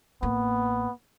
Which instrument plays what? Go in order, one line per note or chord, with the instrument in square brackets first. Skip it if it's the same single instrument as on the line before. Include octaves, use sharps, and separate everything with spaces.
[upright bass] A1 A#3 [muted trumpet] B3